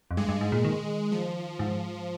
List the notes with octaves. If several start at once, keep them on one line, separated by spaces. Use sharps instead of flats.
F2
G2 G#3
G2
G#2
A#2
D#3
F3
G#2